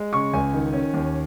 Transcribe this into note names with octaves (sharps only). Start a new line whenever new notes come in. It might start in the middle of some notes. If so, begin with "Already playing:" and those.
Already playing: G#3
C#3 C#6
C#2 G#5
D#3
C#4
D#2